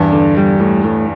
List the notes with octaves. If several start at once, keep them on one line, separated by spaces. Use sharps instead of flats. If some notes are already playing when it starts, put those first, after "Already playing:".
Already playing: E2 G2 D4
D3
G3
A2
A2